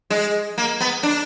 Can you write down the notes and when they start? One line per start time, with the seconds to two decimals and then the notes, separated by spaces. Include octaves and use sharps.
0.10 G#3
0.58 A#3
0.80 B3
1.03 D4